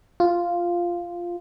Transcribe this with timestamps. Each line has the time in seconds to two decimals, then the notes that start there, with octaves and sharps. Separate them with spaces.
0.20 F4